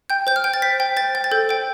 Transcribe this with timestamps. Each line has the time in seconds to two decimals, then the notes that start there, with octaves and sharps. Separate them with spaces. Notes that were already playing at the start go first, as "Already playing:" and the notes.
0.10 G5 G6
0.27 C5 G6
0.36 F6
0.44 G5 G6
0.54 A6
0.62 C5 B6
0.80 G5
0.97 C5 A6
1.15 G5
1.24 A6
1.31 A4 G6
1.49 C5 G5